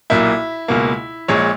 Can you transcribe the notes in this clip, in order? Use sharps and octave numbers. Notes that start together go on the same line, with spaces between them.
B1 A#2 A#3 E4
C#2 B2 A#3
A#1 A#2 G#3 C#5